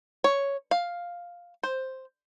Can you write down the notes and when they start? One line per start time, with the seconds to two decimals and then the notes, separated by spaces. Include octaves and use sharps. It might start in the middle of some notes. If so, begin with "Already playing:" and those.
0.24 C#5
0.71 F5
1.63 C5